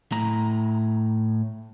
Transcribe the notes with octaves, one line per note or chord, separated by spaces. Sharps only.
A2 A#5